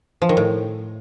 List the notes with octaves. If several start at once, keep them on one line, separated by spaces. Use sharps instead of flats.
F3
D#3
A2